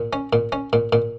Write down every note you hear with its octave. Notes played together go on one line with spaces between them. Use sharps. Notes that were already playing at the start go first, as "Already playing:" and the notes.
Already playing: A#2
C#4
A#2
C#4
A#2
A#2